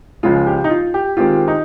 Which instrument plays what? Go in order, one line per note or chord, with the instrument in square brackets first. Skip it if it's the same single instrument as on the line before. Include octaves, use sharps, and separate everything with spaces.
[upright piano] C#2 C#3 F3 G#3 [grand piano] F4
[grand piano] G4
D#4
F4
G4
[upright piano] D#3 G#3 C4 G4 [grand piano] F4
[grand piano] D#4